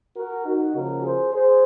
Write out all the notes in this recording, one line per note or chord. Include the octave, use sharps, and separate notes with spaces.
F#4 A#4
D#4 F#4
C#3 F3 A#3 F#4 A#4
G#4 C5
G#4 C5